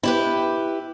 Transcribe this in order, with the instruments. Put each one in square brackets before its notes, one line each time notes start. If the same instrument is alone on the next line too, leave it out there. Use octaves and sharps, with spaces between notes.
[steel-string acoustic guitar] E4 G4 B4